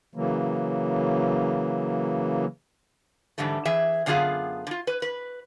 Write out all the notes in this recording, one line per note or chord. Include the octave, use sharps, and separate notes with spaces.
C#3 E3 F#3 A#3
G#2 D3 E3 G3 A3
E3 G#4 E5
F#2 D3 B3 F4 G#4 F5
D3 F4
B4
B4